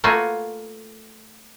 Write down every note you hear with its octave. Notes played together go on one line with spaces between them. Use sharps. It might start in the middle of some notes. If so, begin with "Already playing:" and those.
A3 A#3 F4 F#4 B4 G#5